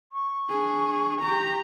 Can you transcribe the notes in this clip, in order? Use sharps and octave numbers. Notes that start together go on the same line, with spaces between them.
C#6
D4 G#4
G4 A#5